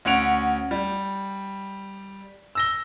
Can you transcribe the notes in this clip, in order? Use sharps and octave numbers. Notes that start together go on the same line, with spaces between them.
D2 C#4 F#5 D7 F7
G3
E6 A#6 G7